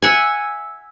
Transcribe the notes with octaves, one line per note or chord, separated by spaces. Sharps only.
E5 F#5 G#5